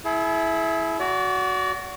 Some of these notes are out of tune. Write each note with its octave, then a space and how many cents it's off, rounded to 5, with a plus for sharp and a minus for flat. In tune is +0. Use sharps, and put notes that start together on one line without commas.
E4 +0 G#4 +40
F#4 +0 D5 -35